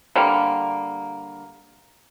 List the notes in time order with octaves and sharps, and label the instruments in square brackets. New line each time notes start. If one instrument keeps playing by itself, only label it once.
[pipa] D3 G3 A#3